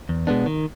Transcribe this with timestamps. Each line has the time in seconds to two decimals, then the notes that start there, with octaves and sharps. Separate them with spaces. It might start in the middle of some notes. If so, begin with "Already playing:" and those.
0.09 E2
0.27 B2 G#3 B3 D4
0.46 D#3